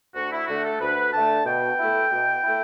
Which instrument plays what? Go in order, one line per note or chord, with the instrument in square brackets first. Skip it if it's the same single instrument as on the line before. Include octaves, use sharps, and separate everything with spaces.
[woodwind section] D2 F#4
E4
D3 A3 F#4
A4
D2 B4
D3 A3 A5
B2 G5
A3 E4
B2
A3 E4